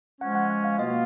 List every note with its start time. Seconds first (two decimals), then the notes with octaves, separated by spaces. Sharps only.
0.21 F3 G#3 C#4 F#5
0.35 F#5
0.50 F#5
0.64 F5
0.79 B2 A#3 F4 D#5